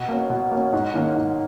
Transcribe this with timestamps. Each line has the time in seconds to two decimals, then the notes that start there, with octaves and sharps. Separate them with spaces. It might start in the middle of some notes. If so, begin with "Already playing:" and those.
Already playing: B2
0.09 A#3 C#4
0.30 B2
0.51 A#3 C#4
0.72 G#2
0.94 D#3 A#3 C#4
1.15 G#2